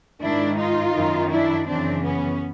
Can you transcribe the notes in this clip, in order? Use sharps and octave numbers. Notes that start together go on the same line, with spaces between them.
G#2 D#3 D4 E4
D#4 F4
F#2 D#3
D4 E4
F#2 C#3 E3 C4 D4
B3 C#4